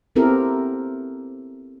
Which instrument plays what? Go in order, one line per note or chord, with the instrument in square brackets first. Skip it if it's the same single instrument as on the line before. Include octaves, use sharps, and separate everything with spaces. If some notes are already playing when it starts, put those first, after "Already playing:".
[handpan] B3 C4 E4 G4 A4 A#4